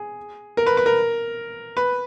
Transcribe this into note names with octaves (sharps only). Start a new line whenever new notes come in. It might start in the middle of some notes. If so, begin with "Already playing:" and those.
Already playing: G#4
A#4
B4
B4
A#4
B4